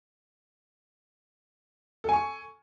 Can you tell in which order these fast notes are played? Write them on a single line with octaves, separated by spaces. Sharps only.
A4 G#5 C#6